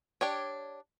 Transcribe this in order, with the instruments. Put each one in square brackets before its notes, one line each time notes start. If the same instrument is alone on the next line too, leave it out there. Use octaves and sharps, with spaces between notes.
[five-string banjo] D4 G4 C#5